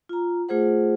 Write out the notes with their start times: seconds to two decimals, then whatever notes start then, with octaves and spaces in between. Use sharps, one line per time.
0.09 F4 A#5
0.49 A3 F4 G#4 C5 F#5